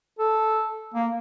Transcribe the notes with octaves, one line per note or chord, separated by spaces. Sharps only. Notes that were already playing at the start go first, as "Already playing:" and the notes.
A4
A#3